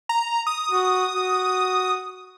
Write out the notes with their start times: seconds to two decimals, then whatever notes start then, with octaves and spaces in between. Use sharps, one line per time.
0.09 A#5
0.47 D#6
0.71 F#4
1.13 F#4